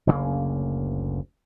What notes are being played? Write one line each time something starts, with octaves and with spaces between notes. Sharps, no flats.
F#1 D2 C#3 A#3